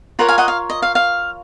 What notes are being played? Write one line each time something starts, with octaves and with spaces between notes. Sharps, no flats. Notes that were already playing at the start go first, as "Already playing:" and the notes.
F4 A#4 C#5 F#5 A#5
F5 G#5
D#5 F#5
F5
D#5
F5
F5